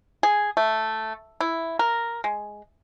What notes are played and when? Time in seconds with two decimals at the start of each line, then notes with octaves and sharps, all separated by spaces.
0.23 G#4
0.57 A3
1.41 E4
1.79 A#4
2.24 G#3